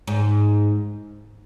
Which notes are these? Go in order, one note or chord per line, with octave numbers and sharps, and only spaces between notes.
G#2